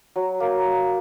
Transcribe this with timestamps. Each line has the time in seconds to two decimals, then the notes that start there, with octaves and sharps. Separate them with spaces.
0.16 F#3
0.40 A#3